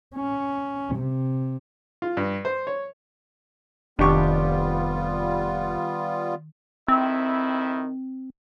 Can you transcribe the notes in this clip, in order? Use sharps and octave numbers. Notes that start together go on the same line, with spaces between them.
C#4
C3
F4
G2
C5
C#5
F1 D#3 G3 B3 D4 F4 G4 C#6
F2 D#3 C4 E4